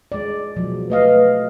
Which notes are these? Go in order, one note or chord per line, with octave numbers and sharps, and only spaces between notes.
G#3 D5
B2 F3 F#3
A3 B4 D#5 F5